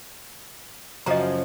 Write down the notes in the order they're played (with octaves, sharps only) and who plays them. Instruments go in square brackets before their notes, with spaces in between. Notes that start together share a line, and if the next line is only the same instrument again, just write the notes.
[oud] F#2 C#3 F3 [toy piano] D#5 A#5